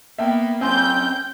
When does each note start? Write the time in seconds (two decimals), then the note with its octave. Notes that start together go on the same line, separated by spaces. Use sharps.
0.18 A#3 B3 E5 G5
0.61 F#2 C4 C#4 G5 G#5 C6 G6